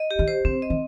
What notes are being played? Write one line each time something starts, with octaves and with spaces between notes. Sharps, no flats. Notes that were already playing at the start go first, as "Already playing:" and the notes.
Already playing: D#5
G4
D#3
C5
D3 C4
D#5
D#3